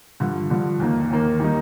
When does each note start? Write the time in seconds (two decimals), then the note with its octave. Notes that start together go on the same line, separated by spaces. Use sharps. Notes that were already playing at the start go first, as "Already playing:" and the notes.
0.20 G2 D3 F3
0.50 G2 D3 F3
0.80 D#2 D#3 A#3
1.10 D#2 D#3 A#3
1.40 D#3 G3 A#3 D#4